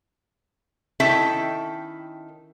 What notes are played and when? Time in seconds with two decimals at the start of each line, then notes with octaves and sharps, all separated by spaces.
1.00 D#3 C#4 E4 A4 E5 G5